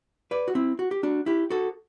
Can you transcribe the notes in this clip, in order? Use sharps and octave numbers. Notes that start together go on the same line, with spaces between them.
B4 D5
F#4
C4 E4
F#4
G4
D4 F#4
E4 G4
F#4 A4